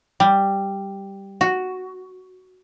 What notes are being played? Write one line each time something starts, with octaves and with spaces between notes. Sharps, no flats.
G3
F#4